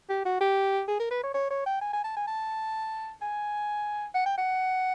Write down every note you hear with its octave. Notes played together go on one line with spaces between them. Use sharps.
G4
F#4
G4
G#4
A#4
B4
C#5
C#5
C#5
G5
G#5
G#5
A5
G#5
A5
G#5
F#5
G5
F#5